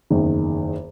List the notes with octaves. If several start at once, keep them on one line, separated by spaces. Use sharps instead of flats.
F#1 E2 D#3